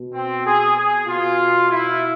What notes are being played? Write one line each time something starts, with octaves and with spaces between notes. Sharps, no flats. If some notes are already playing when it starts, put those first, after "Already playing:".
Already playing: B2
C4
G#4
G#4
B2 F4
E4